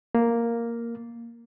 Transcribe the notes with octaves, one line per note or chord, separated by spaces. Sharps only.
A#3